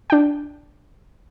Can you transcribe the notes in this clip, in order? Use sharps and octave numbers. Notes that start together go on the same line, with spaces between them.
D4 G5